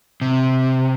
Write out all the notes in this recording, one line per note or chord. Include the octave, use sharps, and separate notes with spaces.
C3